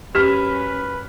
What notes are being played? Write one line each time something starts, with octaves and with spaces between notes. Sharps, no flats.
F#2 C#4 G4 B4 F6 B6 E7